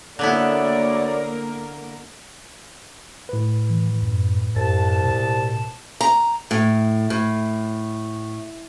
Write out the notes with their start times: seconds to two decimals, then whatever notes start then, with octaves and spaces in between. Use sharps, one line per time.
0.19 D2 D3 A#3 B3 E4 A#4 C#5 D5
3.29 A2 B4
3.70 E3
4.03 F#2
4.56 C2 F#2 A5
5.04 B2
6.01 A#5
6.51 A2
7.10 A2